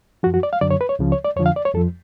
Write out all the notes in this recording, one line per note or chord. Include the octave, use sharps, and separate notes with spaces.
F#2 F3 F#4
F#4
D5
F5
F#2 D3 F#3 D5
C#5
B4
C#5
C#2 C#3 F3
C#5
D5
F2 D3 F3 C#5
F5
D5
C#5
F2 F3 A4